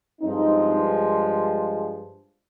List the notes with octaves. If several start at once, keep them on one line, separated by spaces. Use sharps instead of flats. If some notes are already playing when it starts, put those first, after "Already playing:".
G2 F3 G#3 C4 D#4